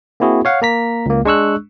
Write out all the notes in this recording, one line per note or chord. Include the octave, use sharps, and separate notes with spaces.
A#3 C4 E4 F#4 G#4
C#5 F5 F#5
A#3 A#5 B6
C#2 A#3
G#3 D4 C#6 E6 F#6